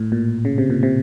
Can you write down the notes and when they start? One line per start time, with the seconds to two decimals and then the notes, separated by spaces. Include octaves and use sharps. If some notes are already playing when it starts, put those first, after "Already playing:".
Already playing: A2
0.12 A#2
0.45 C#3
0.58 C3
0.70 A#2
0.83 C3